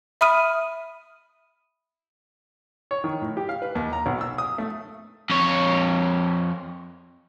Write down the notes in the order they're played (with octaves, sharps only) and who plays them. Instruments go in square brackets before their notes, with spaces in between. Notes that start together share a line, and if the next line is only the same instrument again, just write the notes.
[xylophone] E5 B5 D#6 F6 D#7
[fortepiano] C#5
D#3
A2
G4
F5
B4
D#2
A#5
B1
E6
D#6
A3
[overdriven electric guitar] F2 C#5